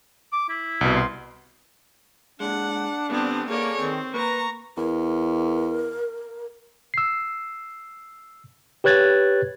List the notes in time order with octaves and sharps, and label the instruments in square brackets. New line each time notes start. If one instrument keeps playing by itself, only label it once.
[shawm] D6
E4
[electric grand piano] C2 B2
[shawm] C6
[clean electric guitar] A#2 G#3 [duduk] D4 [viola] F#5
[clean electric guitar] D3 G3 [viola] B3 C4
[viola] A#3 C#5 [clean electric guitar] G#4 A4 D5
[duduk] D#3 [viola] C4
[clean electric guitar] A#3 [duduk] B4 [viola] A#5 C#6
[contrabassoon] E2 [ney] A#4
[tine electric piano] E6 C7
G4 B4 C#5 F#6 G#6 A6